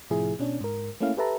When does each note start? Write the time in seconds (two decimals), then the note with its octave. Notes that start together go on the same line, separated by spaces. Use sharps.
0.10 A2 C3 F3 E4 G#4
0.39 B2 C#4 D4
0.60 G#2 A#4
1.01 A3 A#3 C#4 E4 F5
1.17 G4 A4 B4 E5 A5 A#5